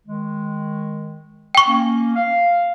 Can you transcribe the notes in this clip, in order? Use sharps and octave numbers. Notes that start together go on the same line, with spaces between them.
D#3 G#3
G5 C#6
A#3 C#4
F5